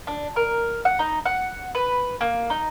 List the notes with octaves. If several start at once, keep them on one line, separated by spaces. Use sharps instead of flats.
D4
A#4
F#5
D#4
F#5
B4
A#3
D#4